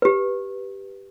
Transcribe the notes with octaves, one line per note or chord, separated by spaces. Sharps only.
G4 B4